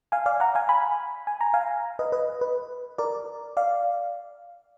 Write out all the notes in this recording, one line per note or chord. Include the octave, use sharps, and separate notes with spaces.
F5 G#5
D5 F5
F#5 A#5
F5 G#5
G#5 B5
G#5
A#5
F5 G#5
B4 D#5
B4 D#5
B4
A#4 D5
D5 F5